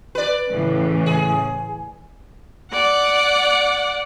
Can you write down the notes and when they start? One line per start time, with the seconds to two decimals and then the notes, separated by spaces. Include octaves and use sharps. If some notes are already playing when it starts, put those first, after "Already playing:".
0.15 B4 D5
0.52 A2 C#3 E3
1.06 G#4
2.72 D5 F#5